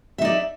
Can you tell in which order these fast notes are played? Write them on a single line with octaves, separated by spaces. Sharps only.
E5 D#4 D5